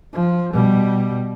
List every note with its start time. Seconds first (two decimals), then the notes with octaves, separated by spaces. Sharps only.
0.13 F3
0.53 B2 G3